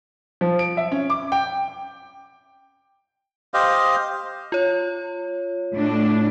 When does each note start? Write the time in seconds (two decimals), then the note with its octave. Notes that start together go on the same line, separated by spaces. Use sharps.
0.41 F3
0.59 D7
0.77 E5
0.92 C#4
1.10 D6
1.32 G5
3.54 G4 C5 D#5 F5
4.52 F4 C#5
5.74 A2 D4